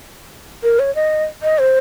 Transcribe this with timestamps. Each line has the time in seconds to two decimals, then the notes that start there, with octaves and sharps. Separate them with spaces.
0.63 A#4
0.79 C#5
0.95 D#5
1.43 D#5
1.59 C5